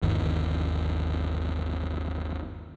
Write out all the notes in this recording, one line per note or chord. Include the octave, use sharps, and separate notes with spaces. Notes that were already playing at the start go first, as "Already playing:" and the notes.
G1 D#2